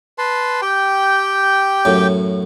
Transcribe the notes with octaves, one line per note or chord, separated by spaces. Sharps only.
B4 A5 C6
G4 G5
F#2 A2